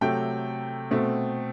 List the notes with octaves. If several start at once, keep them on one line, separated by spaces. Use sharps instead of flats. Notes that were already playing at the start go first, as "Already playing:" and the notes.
C3 F#3 A3 G5
B2 A3 C4